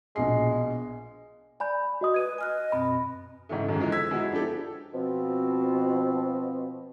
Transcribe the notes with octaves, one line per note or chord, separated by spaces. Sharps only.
A#1 B2 G#3 C7
D5 G#5 B5 G6
F#4 D#5 D#6
B4 G#6 D#7
D#5 G#5 F6 F#6
F#2 B2 C4 B5
G#2 C#3 E3 A3
F#2 D#3 E3 G#3
D3 E3 F3 G#3
E6 G#6 B6
F#3 G#3 B3 E4 G#4
F3 D4 E4 G4 A4
B2 F3 C4